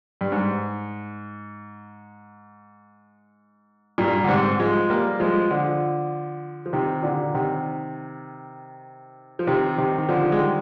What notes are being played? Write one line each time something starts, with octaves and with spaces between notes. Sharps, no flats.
G2
G#2
G2 A#2
D3
G#2 C3
F3 G#3
G3 A#3
F3 G#3
D3 F3
F3
C3 D#3
A#2 D3
C3 D#3
F3
C3 D#3
C3 D#3
D#3
D3 F3
G#3
D#3 G3